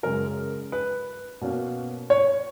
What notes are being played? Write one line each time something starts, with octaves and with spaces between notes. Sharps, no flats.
F#2 C#3 G#3 C#4 A#4
B4
B2 A#3 C#4
C#5